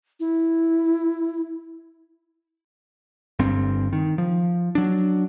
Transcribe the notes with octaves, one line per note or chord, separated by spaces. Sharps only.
E4
G1 G2 C4
D#3
F3
F#3 D4